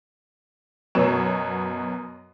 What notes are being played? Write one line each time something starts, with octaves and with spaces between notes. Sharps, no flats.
F#2 B2 B3 C#5 E7